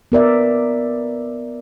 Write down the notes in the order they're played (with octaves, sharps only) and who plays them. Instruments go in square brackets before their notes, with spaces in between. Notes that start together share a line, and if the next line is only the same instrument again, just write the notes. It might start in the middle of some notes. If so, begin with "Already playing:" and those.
[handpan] B3 A#4 D5 E5